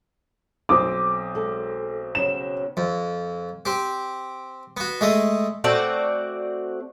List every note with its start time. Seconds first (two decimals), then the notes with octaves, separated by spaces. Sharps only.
0.69 B1 C4 D6 D#6
1.35 G#3 A4
2.15 C#3 F#3 E7
2.77 F2
3.65 C4 G4
4.77 B3 F#4
5.01 G#3 A3 D#5
5.64 A3 C4 F#4 D5